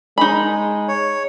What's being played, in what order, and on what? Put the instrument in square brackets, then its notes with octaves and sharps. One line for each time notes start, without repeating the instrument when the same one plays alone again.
[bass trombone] G#3 [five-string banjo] D#4 B5
[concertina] C#5